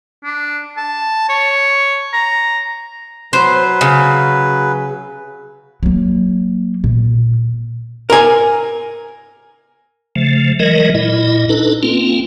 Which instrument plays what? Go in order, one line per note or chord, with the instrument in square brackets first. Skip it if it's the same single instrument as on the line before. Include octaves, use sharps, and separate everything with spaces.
[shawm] D4
A5
C#5
A#5
[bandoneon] F#3 B4 [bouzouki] C5
[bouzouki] C#3
[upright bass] F#3 A#3
A#2
[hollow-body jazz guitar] A#4 G#5
[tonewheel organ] C#3 F3 A3
E3 F#3 G#3 A#4 D#5
A#2 E4 D#5
D4 D#4 A4 B4
A#3 C4 C#4 F4